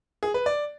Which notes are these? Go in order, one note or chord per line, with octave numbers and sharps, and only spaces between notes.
G#4
B4
D5